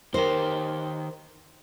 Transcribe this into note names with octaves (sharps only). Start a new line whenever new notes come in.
D#3 G4 A#4 C5